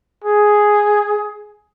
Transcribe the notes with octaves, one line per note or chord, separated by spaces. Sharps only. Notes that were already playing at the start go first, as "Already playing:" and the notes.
G#4